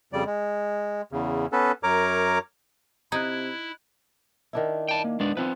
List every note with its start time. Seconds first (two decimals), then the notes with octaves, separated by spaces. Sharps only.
0.13 F2 C#3 G3 D5
0.26 G#3
1.12 E2 C#3
1.52 B3 C#4 A4 B4
1.83 F#2 A#4 C#5 A#5 D6
3.12 C3 D#4 E4 F#6 G#6
4.53 D#3 D4 E4
4.88 G5 A5
5.04 A#3
5.20 G#3 B3 D4 D5
5.37 F3 C4 B4